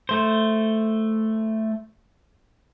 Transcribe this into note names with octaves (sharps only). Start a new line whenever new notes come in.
A3 C5